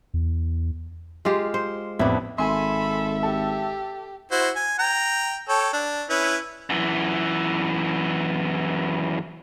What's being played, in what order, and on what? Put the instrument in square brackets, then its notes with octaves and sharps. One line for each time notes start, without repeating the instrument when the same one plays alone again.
[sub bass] E2
[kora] G#3 F4 G4
C5
[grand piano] A1 F2 B3 [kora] D4 E4
[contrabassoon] G#1 [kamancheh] A4 B5 [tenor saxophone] E5 [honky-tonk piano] G#5 C6
[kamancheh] G4 [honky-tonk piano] A4
[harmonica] E4 F#4 C5
G#5
G5 A#5
A4 C#5 G5
D4
C#4 E4 B4
[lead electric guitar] F#2 E3